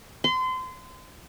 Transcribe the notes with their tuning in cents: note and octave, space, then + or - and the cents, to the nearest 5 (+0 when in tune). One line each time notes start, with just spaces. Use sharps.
C6 -30